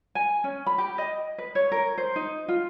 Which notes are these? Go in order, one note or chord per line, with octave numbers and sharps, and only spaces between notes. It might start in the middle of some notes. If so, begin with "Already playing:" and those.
G#5
C#4
B5
G4
D#5
B4
C#5
A#4
C5
D#4
F4